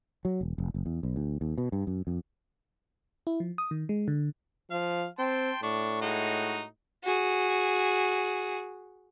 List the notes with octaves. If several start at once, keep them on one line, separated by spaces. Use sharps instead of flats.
F#3
E1
F1
F#1
E2
B1
D2
D#2
B2
G2
F#2
F2
E4
F3
D#6
D#3
G#3
D3
F3 F5
C4 G5 A5 C6
A2 D4 C#6
G#3 D#4 F#4
F#4 G#4